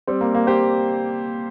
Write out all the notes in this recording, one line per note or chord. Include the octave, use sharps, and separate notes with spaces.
G3 C4
A#3
A#3
G4 C5